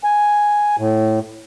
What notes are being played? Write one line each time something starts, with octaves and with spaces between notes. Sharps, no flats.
G#5
A2